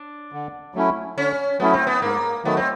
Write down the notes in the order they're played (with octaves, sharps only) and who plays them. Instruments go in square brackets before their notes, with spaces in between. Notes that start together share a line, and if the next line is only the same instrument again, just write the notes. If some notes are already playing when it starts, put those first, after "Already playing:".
Already playing: [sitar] D4
[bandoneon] D3
F#3 A3 C#4 E4
[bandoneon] D3 [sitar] C#4
[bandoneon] F#3 A3 C#4 E4 [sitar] B3
[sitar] C4
B3
[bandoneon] G#2 [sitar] A#3
[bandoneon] D#3 F#3 A3 [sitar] B3
[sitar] C4